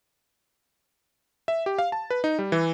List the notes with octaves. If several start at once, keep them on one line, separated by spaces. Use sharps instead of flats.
E5
G4
F5
A5
B4
D#4
G3
E3